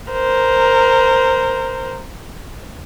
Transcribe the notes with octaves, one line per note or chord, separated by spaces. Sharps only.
A#4 C5